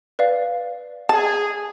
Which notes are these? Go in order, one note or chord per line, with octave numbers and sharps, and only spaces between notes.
B4 D5 F5
G#4 A5